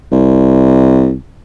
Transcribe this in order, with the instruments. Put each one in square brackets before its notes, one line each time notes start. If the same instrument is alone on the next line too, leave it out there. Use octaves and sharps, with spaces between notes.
[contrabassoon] C2